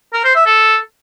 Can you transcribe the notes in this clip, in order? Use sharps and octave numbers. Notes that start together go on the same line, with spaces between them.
A#4
C5
E5
A4